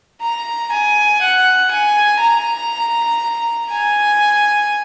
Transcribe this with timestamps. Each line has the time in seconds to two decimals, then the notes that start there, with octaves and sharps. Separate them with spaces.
0.22 A#5
0.72 G#5
1.21 F#5
1.71 G#5
2.21 A#5
3.70 G#5